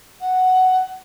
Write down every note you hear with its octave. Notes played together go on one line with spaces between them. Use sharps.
F#5